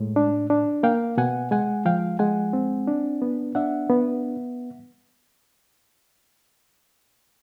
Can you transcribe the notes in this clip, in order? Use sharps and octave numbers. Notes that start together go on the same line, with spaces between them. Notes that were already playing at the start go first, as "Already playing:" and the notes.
Already playing: A2 G#3
D4
D4
A#3 F5 G5
B2 F#5 G#5
G#3 F#5 G#5
F3 F5 G5
G#3 F#5 G#5
C4
D4
B3
D4 E5 F#5
B3